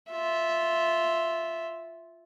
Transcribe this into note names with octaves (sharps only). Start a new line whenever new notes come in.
F4 E5